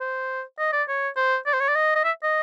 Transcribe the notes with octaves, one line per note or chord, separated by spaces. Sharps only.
C5
D#5
D5
C#5
C5
D5
C5
C#5
D5
D#5
D#5
E5
D#5